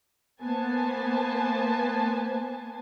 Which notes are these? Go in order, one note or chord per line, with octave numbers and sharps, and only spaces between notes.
A#3 B3 C5 G#5 A5